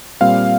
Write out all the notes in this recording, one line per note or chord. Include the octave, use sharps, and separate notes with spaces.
A#2 G3 C4 F5